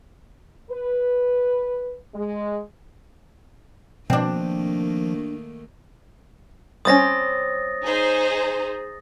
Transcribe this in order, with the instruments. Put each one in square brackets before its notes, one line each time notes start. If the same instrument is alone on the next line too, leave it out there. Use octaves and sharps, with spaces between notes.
[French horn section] B4
G#3
[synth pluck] B2 [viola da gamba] D#3 A3 A#3 [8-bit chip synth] F3 [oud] C4 D4
[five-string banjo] G3 C4 C#4 [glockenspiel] D#6 A6 A#6
[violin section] D#4 G#4 C5